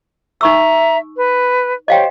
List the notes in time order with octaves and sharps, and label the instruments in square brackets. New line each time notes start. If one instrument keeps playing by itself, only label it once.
[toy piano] D#4 C#6 E6 [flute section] E5 A#5
[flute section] B4
[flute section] G4 C5 C#5 [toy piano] D#5 F5 G5